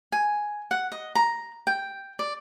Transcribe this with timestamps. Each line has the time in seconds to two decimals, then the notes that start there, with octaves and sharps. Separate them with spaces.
0.12 G#5
0.71 F#5
0.92 D#5
1.15 A#5
1.67 G5
2.19 D5